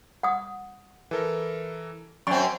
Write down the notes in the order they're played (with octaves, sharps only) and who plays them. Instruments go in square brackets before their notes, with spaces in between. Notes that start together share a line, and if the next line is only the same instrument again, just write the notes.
[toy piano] F#5 D#6
[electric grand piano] E3 A4 A#4
[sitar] F#2 C4 [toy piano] C#6 [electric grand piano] A6 D7